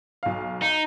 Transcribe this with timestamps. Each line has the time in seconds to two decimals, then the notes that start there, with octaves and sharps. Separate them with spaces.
0.23 B1 F5
0.62 D#4